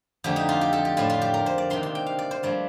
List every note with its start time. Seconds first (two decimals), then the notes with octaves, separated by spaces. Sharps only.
0.24 F2 D3 A3 D4 G4
0.36 D#4
0.49 F4
0.61 G4
0.73 A4
0.85 G4
0.97 A2 A3 D4 F4
1.10 F4
1.22 G4
1.34 A#4
1.46 C5
1.58 D5
1.70 C3 D#3 A#3 D4 C6
1.83 C6
1.95 G5
2.06 F5
2.19 D5
2.31 C5
2.43 G2 F3 A3 D4 D5